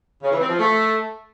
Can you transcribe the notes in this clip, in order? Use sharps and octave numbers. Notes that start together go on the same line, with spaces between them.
C#3
E3
C4
F3
A3